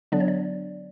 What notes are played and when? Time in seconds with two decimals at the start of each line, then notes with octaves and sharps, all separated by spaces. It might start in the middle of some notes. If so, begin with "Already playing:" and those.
0.12 D3 F#3 B3 D4 D5
0.20 C#5
0.28 D5